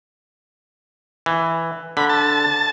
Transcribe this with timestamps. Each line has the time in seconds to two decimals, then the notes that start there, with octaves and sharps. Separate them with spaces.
1.26 E3
1.97 D3 B5
2.09 A5